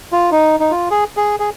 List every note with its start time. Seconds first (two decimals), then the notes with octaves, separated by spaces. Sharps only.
0.12 F4
0.32 D#4
0.60 D#4
0.71 F4
0.91 G#4
1.17 G#4
1.40 G#4